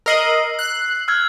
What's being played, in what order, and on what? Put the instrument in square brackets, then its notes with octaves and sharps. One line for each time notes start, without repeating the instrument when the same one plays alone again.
[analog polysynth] A#4 D#5 [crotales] E6 C7 F#7
[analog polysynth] F#6
[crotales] E6 F6 G#6